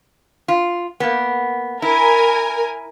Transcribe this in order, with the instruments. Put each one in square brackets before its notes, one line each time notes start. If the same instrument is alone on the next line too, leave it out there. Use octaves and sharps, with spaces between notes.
[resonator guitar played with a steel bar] F4
A#3 B3
[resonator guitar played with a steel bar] E4 [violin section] A#4 G#5